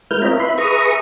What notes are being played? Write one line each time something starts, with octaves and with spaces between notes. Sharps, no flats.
G#3 E4 A#4 B4 F6 G6
C4 F4 A#4 C#5 D#5 E5
E4 B4 E5 B5 C6
G#4 B4 E5 A#5 C#6 D#6